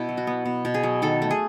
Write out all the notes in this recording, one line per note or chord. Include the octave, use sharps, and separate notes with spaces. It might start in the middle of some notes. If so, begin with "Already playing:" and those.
Already playing: B2 E4
F#3
F#4
B3
B2
B2
G#4
F#3
D#3 A4
A3
G#4